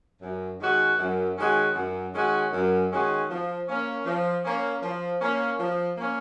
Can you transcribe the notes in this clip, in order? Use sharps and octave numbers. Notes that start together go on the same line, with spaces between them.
F#2
D#3 G#3 C#4 F#4
F#2
D#3 G#3 C#4 F#4
F#2
D#3 G#3 C#4 F#4
F#2
D#3 G#3 C#4 F#4
F3
A#3 C#4
F3
A#3 C#4
F3
A#3 C#4
F3
A#3 C#4